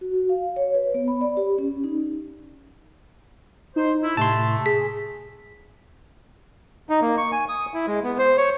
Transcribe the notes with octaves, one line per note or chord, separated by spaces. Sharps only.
F#4
F#4
F5
C#5
B4
B3
B5
D5
G4
C#4
D#4
D#4 C5
E4
A2 C3 A3 A5 C6
G#4 B6
D#4
A#3
C#6
G#5
D#6
E4
G#3
B3
C5
C#5